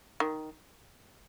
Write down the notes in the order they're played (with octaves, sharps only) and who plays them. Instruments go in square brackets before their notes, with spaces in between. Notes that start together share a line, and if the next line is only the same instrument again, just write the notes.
[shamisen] D#3